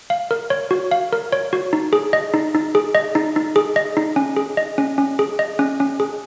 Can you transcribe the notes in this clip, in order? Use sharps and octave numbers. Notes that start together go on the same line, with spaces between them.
F5
A#4
C#5
F#4
F5
A#4
C#5
F#4
D#4
G#4
D#5
D#4
D#4
G#4
D#5
D#4
D#4
G#4
D#5
D#4
C#4
G#4
D#5
C#4
C#4
G#4
D#5
C#4
C#4
G#4